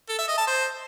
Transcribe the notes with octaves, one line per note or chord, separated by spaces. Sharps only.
A4
E5
D#5
A5
C5